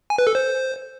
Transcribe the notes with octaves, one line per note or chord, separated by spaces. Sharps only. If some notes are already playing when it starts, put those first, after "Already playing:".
G#5
B4
A4
C5